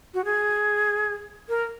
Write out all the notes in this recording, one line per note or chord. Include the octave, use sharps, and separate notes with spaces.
F#4
G#4
A#4